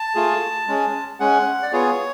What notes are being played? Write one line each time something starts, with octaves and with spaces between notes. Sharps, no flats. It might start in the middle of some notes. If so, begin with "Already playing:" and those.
Already playing: A5
A3 F4 G#4
G#3 C#4 G#4
G#3 C#4 G#4 F#5
D5
B3 F4 G#4 C#5